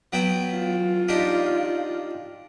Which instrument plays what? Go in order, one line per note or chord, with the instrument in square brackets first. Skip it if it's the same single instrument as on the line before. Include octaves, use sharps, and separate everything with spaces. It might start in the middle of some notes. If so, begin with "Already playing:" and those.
[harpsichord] F#3 B3 G5
[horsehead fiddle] F4
[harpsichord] D4 D#4 G4